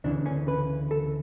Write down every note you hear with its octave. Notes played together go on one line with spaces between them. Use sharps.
D2 C#3 E3 D4
C#4
B4
A4